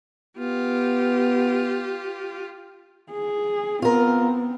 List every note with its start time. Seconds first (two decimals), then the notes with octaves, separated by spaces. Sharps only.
0.39 B3 F4 G4
3.10 G#4
3.82 B3 C4 F4 A#4